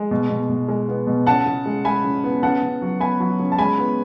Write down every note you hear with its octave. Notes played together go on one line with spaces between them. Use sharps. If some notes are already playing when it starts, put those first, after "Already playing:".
Already playing: G#3
B2
B2
B2
G#3
B3
B2
C#3 F#5 A5
C#3
G#3
G#3 G#5 B5
C#3
B3
C#3 F#5 A5
C#3
F#3
B3 G#5 B5
F#3
C#3
A5
G#3 G#5 B5
B3